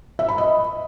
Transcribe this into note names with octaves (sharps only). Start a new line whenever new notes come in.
E5
B5
D#5